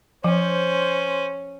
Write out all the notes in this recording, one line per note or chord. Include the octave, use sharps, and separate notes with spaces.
F3 C#4 C5